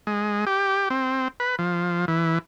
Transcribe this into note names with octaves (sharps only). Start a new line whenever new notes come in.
G#3
G4
C4
B4
F3
E3